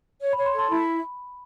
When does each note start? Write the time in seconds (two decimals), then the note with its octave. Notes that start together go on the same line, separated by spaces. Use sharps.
0.21 C#5
0.33 C#5 B5
0.46 C6
0.53 A4
0.59 C6
0.71 E4 B5